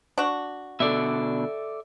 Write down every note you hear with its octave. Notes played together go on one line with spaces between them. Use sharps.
D4 F#4
B2 D3 A4 D5 E5